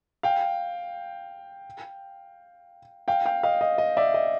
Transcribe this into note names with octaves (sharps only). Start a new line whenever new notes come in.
F5 G5
F5 G5
F5 G5
D#5 F5
D#5
D#5
D5 E5
D#5